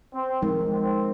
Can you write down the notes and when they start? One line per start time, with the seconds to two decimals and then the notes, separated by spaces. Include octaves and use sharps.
0.14 C4
0.42 F3 G#3 D#4 A#4
0.72 C4